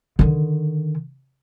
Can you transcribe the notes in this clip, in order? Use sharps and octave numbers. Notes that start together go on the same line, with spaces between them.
D3 D#3